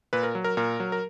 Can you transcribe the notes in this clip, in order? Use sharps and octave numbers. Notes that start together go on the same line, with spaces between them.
A#2 B4
A#4
F#3
A#4
A#2 A#4
F#3
A#4